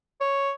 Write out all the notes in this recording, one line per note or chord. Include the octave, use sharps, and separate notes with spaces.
C#5